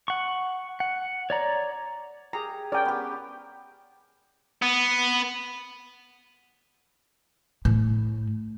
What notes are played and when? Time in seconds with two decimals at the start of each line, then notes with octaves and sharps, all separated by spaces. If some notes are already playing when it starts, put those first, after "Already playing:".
0.08 F#5 C#6
0.80 F#5
1.30 C#5 D5 A#5
2.33 G4 G#4 A#5
2.72 C#4 A#4 D5 G5
2.85 B3 G4
4.62 B3
7.65 A2